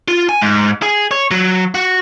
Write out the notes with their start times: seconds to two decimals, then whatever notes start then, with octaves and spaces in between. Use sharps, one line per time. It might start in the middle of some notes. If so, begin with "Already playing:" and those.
0.08 F4
0.29 G#5
0.42 G#2
0.82 G#4
1.11 C#5
1.31 F#3
1.75 F#4